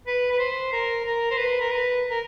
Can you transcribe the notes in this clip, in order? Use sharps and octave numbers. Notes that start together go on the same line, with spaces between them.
B4
B4
C5
A#4
A#4
C5
B4
A#4
B4
A#4